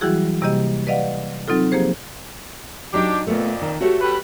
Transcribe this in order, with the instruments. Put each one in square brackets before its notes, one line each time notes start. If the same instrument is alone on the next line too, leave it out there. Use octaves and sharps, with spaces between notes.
[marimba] E3 F#3 G3 E4 F#4 G#4
C3 G3 A#3 G4 D#5
B4 D5 D#5 F5 F#5
F#3 C4 D#4 F4 A4
F3 A#3 G4 G#4 C5
[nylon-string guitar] F#3 D#4 [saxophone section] D4 G4
[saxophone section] F2 A#2 [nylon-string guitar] A3 B3
[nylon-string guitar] D#3
[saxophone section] A3 [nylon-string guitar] F#4 G4 C#5
[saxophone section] G3 A4 B4